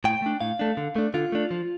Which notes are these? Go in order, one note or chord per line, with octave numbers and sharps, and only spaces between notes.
A2 G5
A3 D4
A2 F5
A3 D4
D3
A3 D4
D3 F4
A3 D4
F3